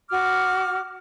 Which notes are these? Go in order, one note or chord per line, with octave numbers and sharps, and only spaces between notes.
F#4 D6 F6